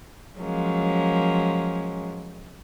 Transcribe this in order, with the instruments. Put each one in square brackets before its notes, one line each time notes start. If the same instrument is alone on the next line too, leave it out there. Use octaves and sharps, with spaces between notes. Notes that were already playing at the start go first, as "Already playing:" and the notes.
[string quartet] F3 F#3 G#3 A#3 C#4